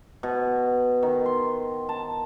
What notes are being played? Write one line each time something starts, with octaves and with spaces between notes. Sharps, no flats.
B2
D#3
C6
A5